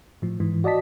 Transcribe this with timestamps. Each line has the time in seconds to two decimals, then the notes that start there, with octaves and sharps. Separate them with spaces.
0.22 A2 F3
0.40 G#2 E3
0.64 F#4 D5 D#5 A5 B6